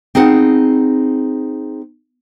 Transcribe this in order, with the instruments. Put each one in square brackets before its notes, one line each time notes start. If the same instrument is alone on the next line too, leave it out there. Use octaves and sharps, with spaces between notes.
[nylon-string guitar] C4 D#4 G#4 F#5